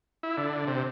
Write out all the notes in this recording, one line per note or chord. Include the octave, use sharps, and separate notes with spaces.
E4
D3
C3